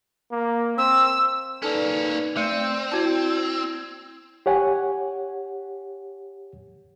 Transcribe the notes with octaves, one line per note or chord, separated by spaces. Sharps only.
A#3
C4 E6
A#3 C#4 D#4 A4 B4 D5 A5
A3 C4 D5 G6 C#7 D#7
E4 F#4 A5 G#6
G4 C#5 F#5 G#5